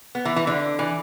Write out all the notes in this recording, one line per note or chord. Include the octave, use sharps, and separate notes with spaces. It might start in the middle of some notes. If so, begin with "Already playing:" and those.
B3
E3
E3
D3
E3